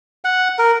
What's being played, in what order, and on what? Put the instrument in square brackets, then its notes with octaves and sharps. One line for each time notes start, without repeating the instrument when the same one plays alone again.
[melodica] F#5
A#4